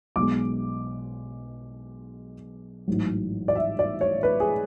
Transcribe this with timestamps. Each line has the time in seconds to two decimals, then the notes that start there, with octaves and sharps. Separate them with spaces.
0.16 B1 B2 G#3 D6
2.88 A1 G#2 F#3
3.48 D5
3.55 E5
3.79 D5
4.01 C#5
4.23 B4
4.40 G#4